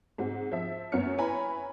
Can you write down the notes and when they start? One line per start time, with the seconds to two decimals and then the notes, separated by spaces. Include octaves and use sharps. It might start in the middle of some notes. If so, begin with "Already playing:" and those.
0.18 G#2 C4 F#4
0.52 F3 E5
0.92 F#2 A#3 B3 C#5 F6 C#7
1.18 E4 B4 C#5 G#5 A#5 B5